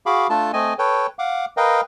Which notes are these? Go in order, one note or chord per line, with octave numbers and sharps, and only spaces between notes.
F#4 G#4 F5 B5 D6
A3 D4 F4 A4 A5
A3 C4 D#5 G#5
A4 B4 C#5 G5
F5 F#5 D6
A#4 B4 D#5 F5 G5